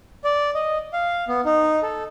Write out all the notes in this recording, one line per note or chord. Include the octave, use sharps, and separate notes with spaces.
D5
D#5
F5
B3
D#4
A4